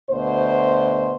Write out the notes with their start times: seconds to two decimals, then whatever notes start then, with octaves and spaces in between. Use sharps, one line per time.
0.10 D2 B2 C5